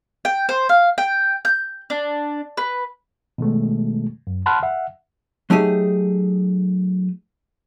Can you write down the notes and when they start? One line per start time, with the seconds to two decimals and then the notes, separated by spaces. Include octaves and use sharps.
0.25 G5
0.49 C5
0.69 F5
0.98 G5
1.45 G6
1.90 D4
2.57 B4
3.38 B2 D#3 G#3 A3
4.27 F#2
4.46 F#5 A5 B5 C6 F6 F#6
4.63 E5 F#5
5.50 F#3 A3 D#4 G4 G#4